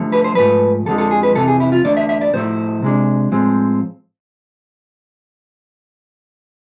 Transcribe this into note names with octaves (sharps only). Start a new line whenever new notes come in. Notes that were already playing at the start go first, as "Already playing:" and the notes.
Already playing: D3 F3 A3
B4
C5
G#2 F3 A3 B4
F2 D3 F3 G#3 A4
A4
G#4
B4
F2 C3 E3 A4
G#4
E4
F4
E2 D3 A3 D4 D5
E5
E5
D5
A2 F3 A3 E4 C5
C3 G#3 D4
A2 F3 G#3 C4